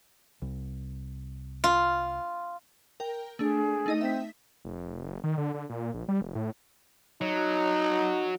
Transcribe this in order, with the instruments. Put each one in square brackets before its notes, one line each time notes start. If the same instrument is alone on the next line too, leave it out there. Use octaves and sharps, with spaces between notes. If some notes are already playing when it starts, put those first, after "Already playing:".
[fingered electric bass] C2
[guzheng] F4
[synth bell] A#4 G5
[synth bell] A3 D4 [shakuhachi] G#4
[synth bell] A3 D#4 D#5
[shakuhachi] C4 [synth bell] E5 B6
[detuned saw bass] F1
F#1
D#3
D3
D3
A#2
A#1
G3
F1
A2
[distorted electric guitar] F#3 [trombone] D#4